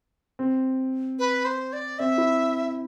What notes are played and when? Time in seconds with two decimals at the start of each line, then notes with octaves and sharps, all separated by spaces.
0.39 C4
1.19 B4
1.45 C5
1.73 D5
1.99 C4 E5
2.18 E4